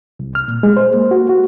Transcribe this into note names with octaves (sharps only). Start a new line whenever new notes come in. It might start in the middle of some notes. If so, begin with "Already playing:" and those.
C2
F6
A#2
G#3
C5
A#3
F#4
F#4